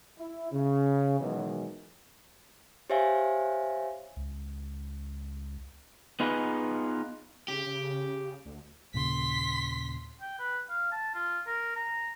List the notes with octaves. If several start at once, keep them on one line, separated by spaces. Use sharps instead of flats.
E4
C#3
B2 D#3 E3 F#3 G#3
G4 C5 C#5 E5 F5 G#5
C#2
B3 D#4 F4 G#4 B4
C#3 G4
C#3
D2
D#2 A#2 C#3 C6 B6
G5
B4
F5
A5
F4
A#4
A#5